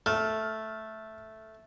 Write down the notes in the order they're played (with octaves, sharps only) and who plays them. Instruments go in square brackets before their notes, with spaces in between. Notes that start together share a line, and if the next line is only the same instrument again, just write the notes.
[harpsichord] A3 [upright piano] F6